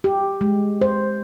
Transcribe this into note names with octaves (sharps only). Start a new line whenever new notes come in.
G4
G#3
C5